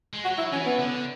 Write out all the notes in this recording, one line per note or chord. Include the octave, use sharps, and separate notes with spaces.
G#3
F#3 F#4
E4
E3 C#4
B3
D3